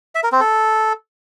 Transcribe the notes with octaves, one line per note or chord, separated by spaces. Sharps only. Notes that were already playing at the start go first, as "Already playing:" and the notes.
E5
A#4
C4
A4